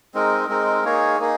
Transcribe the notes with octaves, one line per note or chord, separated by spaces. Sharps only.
G#3 C4 D#4 A#4
G#3 C4 D#4 A#4
A#3 D#4 G#4 C#5
A#3 D#4 G#4